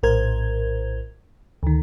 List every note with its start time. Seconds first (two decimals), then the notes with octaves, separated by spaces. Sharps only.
0.03 A#1 A2 A#4 C5 G#6
1.63 D2 D#3